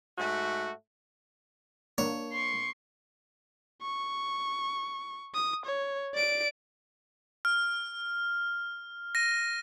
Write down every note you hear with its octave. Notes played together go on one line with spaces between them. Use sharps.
G#2 A3 F#4
A#3 D4 C#5
C6 C#6
C#6
D#6
C#5
D5 D7
F6
A#6 D#7